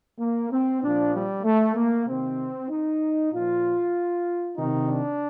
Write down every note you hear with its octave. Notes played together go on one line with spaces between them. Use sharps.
A#3
C4
A#2 F3 D4
G3
A3
A#3
C3 D#3 C4
D#4
A#2 F3 F4
C3 D#3 D#4
D4